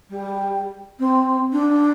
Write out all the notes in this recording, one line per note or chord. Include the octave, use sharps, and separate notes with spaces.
G3
C4
D4